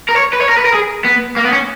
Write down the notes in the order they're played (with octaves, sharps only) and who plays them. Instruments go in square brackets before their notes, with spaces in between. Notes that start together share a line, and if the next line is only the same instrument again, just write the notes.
[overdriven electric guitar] A#4
C#5
B4
C#5
A#4
B4
A#4
G#4
B3
A#3
B3
C#4